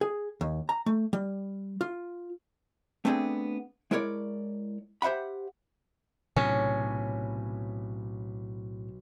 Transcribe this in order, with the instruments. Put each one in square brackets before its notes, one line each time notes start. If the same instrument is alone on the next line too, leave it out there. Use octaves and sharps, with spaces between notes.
[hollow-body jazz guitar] G#4
D#2
A#5
A3
G3
F4
A3 B3 C4 D4 G#4
G#3 E4 A#4 C#5 D5
G4 C5 E5 F#5 B5
[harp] B1 [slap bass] A2 C3 [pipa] C#4